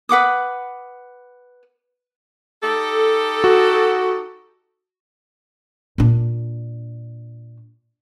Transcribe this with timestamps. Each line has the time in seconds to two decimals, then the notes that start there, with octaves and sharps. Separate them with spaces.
0.09 B4 F#5 D6 D#6
2.63 D#4 G4 A4
3.44 F#4
5.98 A#2 D4